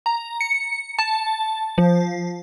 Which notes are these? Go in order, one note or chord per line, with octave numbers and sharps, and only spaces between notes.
A#5
C#7
A5
F3